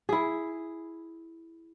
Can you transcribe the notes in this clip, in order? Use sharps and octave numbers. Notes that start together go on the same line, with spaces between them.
E4 G#4